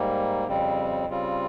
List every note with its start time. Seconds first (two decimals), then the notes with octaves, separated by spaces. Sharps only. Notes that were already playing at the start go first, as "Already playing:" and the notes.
Already playing: G#2 G3 A#3
0.47 F2 C#3 G3 C4
1.09 C#3 G3 C4 F4